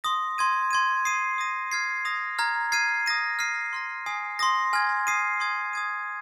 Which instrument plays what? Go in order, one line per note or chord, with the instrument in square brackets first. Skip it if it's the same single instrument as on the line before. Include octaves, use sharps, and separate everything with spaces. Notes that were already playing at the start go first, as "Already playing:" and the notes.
[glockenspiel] C6 D#6 A#6
C6 G#6 D#7
C6 G#6 D#7
D#6 C7 D#7
D#6 A#6 D#7
F6 G#6 C7
D#6 A#6 F7
A#5 F6 G#6
F6 G#6 C7 D#7
D#6 A#6 D#7
F6 C7 D#7
C6 F6 A#6
G#5 D#6 C7
C6 D#6 A#6
G#5 F6 G#6
D#6 C7 D#7
C6 D#6 G#6
D#6 G#6 D#7